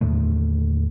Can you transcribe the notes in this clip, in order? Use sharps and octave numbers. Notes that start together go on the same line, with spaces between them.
D#2 A2 D3 A3